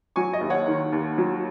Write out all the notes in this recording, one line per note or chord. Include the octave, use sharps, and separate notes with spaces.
F#3 G#5 C#6
D#5
D#2
C#5 F#5
D#3
D#2
F#3